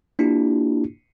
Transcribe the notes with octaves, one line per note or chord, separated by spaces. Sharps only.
A#3 D4 E4 F4 G4